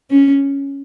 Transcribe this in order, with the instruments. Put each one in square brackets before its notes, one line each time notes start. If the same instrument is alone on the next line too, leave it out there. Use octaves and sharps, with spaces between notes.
[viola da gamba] C#4